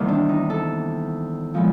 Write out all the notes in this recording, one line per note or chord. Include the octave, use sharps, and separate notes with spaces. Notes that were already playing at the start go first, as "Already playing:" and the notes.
Already playing: E2 C3 D#3 G3 A#3
D4
D#4
A4
A#2 F3 G#3 B3